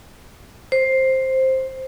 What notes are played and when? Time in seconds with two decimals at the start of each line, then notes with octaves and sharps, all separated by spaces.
0.72 C5